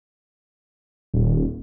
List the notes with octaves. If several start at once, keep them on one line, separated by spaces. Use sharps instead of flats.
D#1